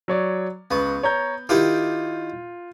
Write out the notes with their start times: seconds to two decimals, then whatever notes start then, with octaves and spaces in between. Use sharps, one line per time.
0.08 F#3 C#5 D5
0.71 C#2 B3 C#6
1.03 C#5 A#5 G6
1.49 D#3 E4 F4 G4